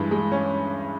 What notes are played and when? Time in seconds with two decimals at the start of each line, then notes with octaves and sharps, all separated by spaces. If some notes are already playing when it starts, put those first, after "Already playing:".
Already playing: G2 E3 G#3
0.11 G#3
0.32 C#4